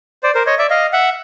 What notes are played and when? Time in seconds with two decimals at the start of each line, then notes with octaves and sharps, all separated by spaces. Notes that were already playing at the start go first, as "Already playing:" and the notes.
0.23 C5 D5
0.35 A#4 C5
0.47 C#5 D#5
0.58 D5 E5
0.70 D#5 F5
0.93 E5 F#5